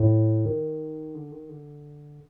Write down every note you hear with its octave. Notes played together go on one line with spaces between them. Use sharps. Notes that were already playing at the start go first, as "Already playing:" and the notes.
Already playing: A2
D#3
D3
D#3
D3